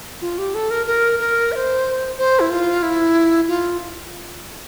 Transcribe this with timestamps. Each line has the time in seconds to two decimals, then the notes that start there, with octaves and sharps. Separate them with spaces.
0.22 F4
0.38 G4
0.55 A4
0.71 A#4
0.87 A#4
1.19 A#4
1.52 E5
1.56 C5
2.18 C5
2.40 E4
2.50 F4
2.83 E4
3.48 F4